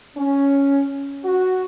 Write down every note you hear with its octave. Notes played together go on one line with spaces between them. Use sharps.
C#4
F#4